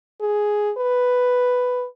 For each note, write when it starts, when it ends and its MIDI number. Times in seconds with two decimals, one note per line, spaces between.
0.21 0.72 68
0.77 1.86 71